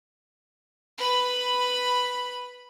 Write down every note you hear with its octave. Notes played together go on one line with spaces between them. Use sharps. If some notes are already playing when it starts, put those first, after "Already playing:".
B4 B5